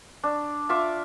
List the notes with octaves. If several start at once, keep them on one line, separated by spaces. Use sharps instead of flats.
D4
F4 E5 D6